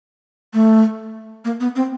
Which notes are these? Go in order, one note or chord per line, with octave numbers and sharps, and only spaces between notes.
A3
A#3
B3
C4